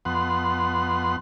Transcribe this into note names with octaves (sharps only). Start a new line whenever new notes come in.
F2 B3 F#5 C6